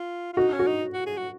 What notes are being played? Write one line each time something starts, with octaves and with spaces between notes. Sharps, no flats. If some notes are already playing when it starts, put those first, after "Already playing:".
Already playing: F4
F4
D#4 F#4
C#4
F#4
D#4
F#4
G#4
F#4